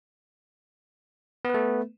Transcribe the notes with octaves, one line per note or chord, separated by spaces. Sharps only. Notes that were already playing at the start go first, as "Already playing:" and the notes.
A3 B3 B4